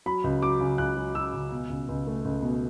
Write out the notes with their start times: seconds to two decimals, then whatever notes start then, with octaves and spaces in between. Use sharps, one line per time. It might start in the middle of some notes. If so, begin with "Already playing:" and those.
0.06 F#3 B5
0.24 C#2
0.42 F#3 D6
0.61 C#3
0.78 C#2 F#6
0.97 F#3
1.15 F#3 E6
1.34 C#2
1.52 B2
1.70 C#2
1.89 C#2
2.07 A3
2.25 C#2
2.42 B2